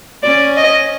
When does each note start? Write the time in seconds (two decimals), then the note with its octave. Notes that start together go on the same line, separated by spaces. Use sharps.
0.23 C#4 D5
0.57 D#5